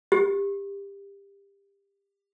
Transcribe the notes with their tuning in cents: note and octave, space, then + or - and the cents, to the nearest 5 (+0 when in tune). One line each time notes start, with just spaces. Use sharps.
G4 +25